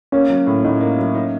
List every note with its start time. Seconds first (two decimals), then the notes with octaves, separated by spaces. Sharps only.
0.12 A#3 C#4
0.30 F#3
0.47 A2
0.64 A2 D#4
0.80 A#3
0.98 F#3
1.15 D#4